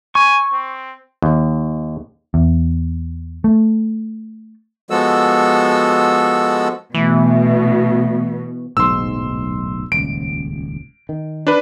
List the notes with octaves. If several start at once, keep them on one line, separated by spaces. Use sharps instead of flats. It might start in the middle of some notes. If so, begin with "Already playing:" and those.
G#5 C#6
C4
D#2
E2
A3
F3 G#3 B3 F#4 A4 E6
B2 E3 A3
D1 B1 G#2 C6 E6
D#1 C#2 D7
D#3
D4 B4